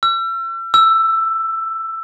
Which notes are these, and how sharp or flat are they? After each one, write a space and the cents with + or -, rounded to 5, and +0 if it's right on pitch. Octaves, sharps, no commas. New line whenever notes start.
E6 +40
E6 +10